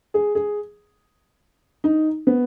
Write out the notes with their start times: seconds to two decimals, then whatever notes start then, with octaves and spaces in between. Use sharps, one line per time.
0.14 G#4
0.35 G#4
1.84 D#4
2.27 B3